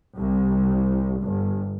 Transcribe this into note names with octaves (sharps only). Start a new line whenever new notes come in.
C2
G1